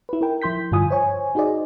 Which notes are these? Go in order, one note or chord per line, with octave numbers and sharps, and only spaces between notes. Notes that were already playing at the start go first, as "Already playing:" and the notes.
E4 B4
E4 A#4 G5
F3 E4 C6 G6 B6
G2 D3 F4 G#5 D#6
C5 C#5 G#5
D#4 F#4 G#4 C5 D5 D#5